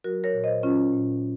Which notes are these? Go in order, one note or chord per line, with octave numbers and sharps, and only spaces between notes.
F#3 F#4 A#4
A#4 C#5
A#2
C5 D#5
F#3 C#4 F4
A#2